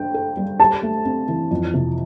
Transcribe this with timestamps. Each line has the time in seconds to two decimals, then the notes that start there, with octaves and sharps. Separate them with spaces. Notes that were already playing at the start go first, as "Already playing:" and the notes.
Already playing: D4 G5
0.14 A4
0.37 G3
0.60 G4 A5
0.83 A3
1.05 C4
1.28 E3
1.51 F2
1.74 C3